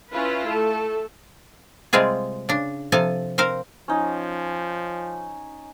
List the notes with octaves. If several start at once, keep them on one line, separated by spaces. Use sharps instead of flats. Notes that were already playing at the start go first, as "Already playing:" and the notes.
C#4 E4 F4 B4
A3 A4
C3 G3 G#3 C4 F4 G#4
C#3 D4
C3 F3 A4 G#5 A5
C4 A#4 C5 F5
F3 C#4 D#4